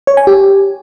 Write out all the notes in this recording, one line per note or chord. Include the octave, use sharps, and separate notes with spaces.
C#5
G#5
G4